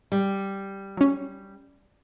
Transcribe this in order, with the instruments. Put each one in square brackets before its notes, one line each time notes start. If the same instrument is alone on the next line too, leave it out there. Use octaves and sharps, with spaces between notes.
[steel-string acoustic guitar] G3
[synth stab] F#3 C#4